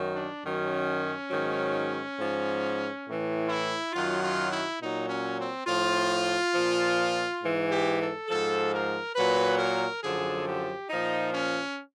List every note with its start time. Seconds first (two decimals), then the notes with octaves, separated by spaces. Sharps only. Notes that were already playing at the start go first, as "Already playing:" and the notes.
Already playing: F#2 D#3 F#3
0.14 D4
0.44 F#2 D#3 F#3 C#4
1.31 G#2 D#3 F#3
2.17 G#2 F3
3.05 A2 E3
3.49 E4
3.93 F#2 D#3 F#3 F4
4.22 F4
4.50 E4
4.80 A#2 F#3 D#4
5.08 C#4
5.38 C4
5.66 A2 F3 F4
6.54 A#2 F3
7.42 G#2 E3
7.70 G4
7.99 A4
8.28 G#2 F3 A4
8.72 A#4
9.15 A#2 F#3 B4
9.59 A#4
10.03 F#2 D3 F3 G#4
10.46 G4
10.90 A#2 F3 D#4
11.34 C#4